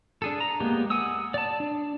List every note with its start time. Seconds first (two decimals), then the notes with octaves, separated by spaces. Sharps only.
0.22 D4 G#4 A4
0.40 A#5
0.60 G#3 A#3 B3 G4
0.90 F#5 G#5 D#6 E6
1.34 D5 A5
1.60 D4